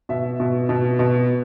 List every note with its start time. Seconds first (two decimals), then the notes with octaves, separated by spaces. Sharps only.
0.09 B2 E5
0.40 B2
0.69 B2
0.99 B2